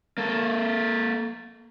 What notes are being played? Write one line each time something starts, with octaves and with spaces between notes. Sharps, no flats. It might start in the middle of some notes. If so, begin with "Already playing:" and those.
A#3 A4